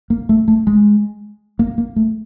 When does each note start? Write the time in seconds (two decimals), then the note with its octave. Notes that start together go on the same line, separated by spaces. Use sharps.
0.10 A#3
0.29 A3
0.48 A3
0.67 G#3
1.59 A#3
1.78 A#3
1.96 A3